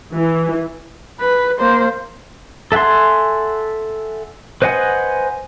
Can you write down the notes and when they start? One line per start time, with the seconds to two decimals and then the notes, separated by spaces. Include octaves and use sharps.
0.13 E3
1.20 B4
1.60 A#3 C5
2.72 A4 E5 F#5 G#5 C6
4.62 B4 C5 D#5 F#5 G#5